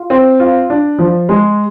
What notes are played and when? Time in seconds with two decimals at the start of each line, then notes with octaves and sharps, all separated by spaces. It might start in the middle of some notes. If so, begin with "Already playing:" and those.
Already playing: F4
0.10 C4
0.40 F4
0.70 D4
0.99 F3
1.29 G#3